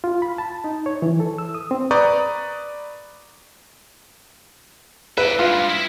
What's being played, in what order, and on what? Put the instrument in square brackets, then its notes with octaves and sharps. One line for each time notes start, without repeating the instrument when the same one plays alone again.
[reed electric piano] F4
B5
A5
D#4
C#5
E3
A4
E6
D#6
C4
[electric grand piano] B4 D5 A#5 C#6 D#6 G6
[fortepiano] B4 [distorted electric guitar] D5 E5
[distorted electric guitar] G2 G#3 [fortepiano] F4
[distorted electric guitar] E4 E5